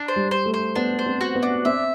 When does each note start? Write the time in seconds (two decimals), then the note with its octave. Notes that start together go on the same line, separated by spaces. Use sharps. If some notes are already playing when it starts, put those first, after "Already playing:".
Already playing: D4
0.08 C5
0.16 G3
0.31 C5
0.46 A3
0.54 C5
0.76 B3 D4
0.99 C5
1.06 C4
1.21 F#4
1.36 B3
1.43 D4
1.65 C4 E5